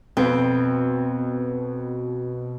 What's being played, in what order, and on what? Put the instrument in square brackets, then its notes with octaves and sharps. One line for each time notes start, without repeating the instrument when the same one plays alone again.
[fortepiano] F2 B3 [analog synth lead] B2 [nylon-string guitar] C4